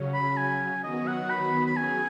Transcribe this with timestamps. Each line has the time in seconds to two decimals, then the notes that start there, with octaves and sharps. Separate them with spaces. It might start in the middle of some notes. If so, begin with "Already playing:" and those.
Already playing: C#3 F#3 C#4
0.14 B5
0.37 G#5
0.83 D#3 F#3 B3 F#4 D#5
1.07 F#5
1.30 B5
1.66 B5
1.77 F#3 C#4 G#4 G#5